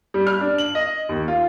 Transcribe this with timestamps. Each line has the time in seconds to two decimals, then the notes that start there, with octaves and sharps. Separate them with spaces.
0.14 G3
0.27 F6
0.41 D4
0.58 F#7
0.75 D#5
1.09 D#2
1.28 F4